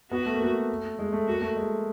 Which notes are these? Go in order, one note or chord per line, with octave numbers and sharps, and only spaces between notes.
B3 F#4
A3
A#3
A3
G#3
A3
A#3 F#4
A3
G#3